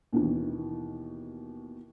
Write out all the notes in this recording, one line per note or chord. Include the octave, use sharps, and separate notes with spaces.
D#2 B2 D#3 E3